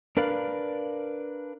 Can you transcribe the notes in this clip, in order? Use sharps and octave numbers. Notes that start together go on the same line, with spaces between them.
D4 A#4 B4 D5 F5